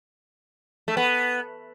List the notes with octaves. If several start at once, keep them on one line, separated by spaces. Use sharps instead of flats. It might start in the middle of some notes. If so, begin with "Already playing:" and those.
A3
B3